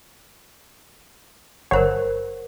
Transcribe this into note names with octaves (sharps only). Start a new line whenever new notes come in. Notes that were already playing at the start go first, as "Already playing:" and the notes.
G1 A#4 C5 C#5 F#5